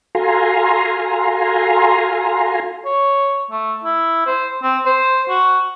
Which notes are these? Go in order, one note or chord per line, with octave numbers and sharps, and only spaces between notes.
F#4 A4 F5 G#5 A#5 C6
C#5
A3
E4
C5
C4
C5
F#4